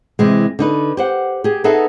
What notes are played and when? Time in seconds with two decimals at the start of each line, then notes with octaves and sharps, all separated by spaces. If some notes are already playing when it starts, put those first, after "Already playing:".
0.19 C3 E3 G#3
0.59 D3 D#4 B4
0.97 G4 C5 F#5
1.44 G4 G#4
1.64 B3 D#4 G#4 A4 B4 E5